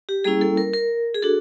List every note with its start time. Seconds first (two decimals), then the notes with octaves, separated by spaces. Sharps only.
0.09 G4
0.24 G3 A#3 C#4 E4 G#4
0.41 A4
0.57 A#4
0.73 A#4
1.15 G#4
1.23 D4 F#4 A4